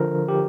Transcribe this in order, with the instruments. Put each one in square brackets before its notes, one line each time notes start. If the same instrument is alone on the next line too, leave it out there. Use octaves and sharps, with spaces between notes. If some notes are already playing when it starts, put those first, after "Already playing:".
Already playing: [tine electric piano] D3 F3 A#4
G4